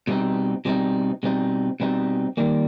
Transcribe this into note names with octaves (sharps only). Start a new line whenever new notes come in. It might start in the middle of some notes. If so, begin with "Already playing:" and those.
B2 G3 C4 D#4
B2 G3 C4 D#4
B2 G3 C4 D#4
B2 G3 C4 D#4
D#3 G3 A#3